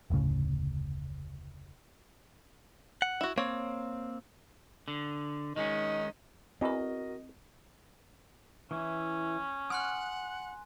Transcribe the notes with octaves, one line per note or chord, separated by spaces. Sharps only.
F1 D2 A2 C#3
F#5
E4 F#4
A#3 C4 C#5
D3
D#3 G#3 C#4 D#4
E2 E3 C4 F#4 A#4 D#5
E3 C#4 E4
F#5 G#5 C6 D#6 F6 F#6